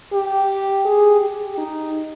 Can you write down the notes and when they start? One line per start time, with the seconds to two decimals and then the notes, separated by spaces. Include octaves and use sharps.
0.13 G4
0.85 G#4
1.21 G4
1.57 D#4